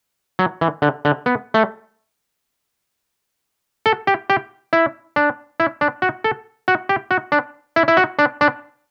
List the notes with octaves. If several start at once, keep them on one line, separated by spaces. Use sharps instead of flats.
F#3
E3
D3
D3
B3
A3
A4
G4
G4
E4
D4
E4
D4
F#4
A4
F#4
G4
F#4
D4
E4
E4
F#4
D4
D4